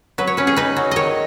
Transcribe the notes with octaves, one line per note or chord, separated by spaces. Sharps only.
F#3 B4
C#5
C#4 B4
G#4
D#4 B4
F#3
D#3 C#5 D#5